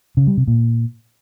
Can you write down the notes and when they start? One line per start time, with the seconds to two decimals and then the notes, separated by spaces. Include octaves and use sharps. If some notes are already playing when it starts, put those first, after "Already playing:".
0.17 C#3
0.27 G3
0.37 C3
0.47 A#2